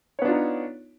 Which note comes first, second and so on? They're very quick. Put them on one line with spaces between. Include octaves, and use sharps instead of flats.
C#5 B3 D4 F4 D#4